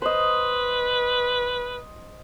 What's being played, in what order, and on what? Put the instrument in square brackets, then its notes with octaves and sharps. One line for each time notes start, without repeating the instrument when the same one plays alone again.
[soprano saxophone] B4 [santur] C5 D#5